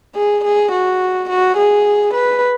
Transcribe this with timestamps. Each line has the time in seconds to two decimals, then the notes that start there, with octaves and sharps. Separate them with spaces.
0.16 G#4
0.45 G#4
0.72 F#4
1.29 F#4
1.57 G#4
2.14 B4